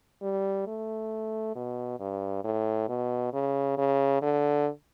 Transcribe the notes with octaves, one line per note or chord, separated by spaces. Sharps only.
G3
A3
B2
G2
A2
B2
C#3
C#3
D3